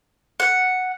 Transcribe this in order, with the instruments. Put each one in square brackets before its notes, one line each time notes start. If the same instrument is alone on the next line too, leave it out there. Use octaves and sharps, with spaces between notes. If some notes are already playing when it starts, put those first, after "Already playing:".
[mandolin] F#5